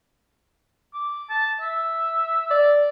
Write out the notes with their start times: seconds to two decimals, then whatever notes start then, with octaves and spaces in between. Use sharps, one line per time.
0.93 D6
1.30 A5
1.61 E5
2.51 D5